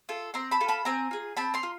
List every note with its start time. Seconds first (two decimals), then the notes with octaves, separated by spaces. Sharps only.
0.09 F4 A4
0.34 C4 A#5 C6
0.51 A5 B5
0.60 F4 A4
0.68 A5 B5
0.85 C4 G#5 A#5
1.11 F4 G#4
1.37 C4 A5 B5
1.54 A#5 C6
1.63 F4